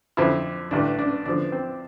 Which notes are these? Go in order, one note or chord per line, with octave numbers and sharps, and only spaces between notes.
F2 D3 F3 E4
A1 G2 D3 D4
D4
E2 D3 F3 D4
C4